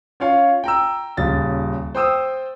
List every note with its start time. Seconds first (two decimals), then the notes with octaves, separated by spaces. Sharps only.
0.20 C#4 F4 C#5 F5
0.64 G5 A#5 E6
1.17 D#1 C#3 A6
1.95 C5 G5 D#6 E6